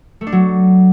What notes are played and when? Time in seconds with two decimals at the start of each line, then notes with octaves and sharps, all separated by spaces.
0.21 A3
0.27 D4
0.32 F#3